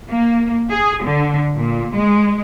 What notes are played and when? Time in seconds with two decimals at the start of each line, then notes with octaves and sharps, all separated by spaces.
0.10 A#3
0.70 G#4
1.04 D3
1.57 A#2
1.95 G#3